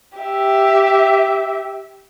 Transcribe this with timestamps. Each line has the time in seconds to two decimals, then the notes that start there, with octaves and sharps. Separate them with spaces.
0.18 G4 E5